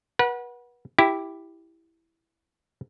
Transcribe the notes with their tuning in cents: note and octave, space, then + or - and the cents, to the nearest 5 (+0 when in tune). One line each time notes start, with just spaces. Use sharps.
B4 -35 F#5 +0
E4 +0 G4 +0